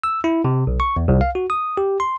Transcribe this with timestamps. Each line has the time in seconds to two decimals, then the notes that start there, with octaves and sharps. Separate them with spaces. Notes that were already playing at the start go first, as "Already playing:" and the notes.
0.04 E6
0.24 E4
0.45 C3
0.67 B1
0.80 C#6
0.96 E2
1.08 C2
1.21 F5
1.35 F#4
1.50 D#6
1.77 G4
2.00 C6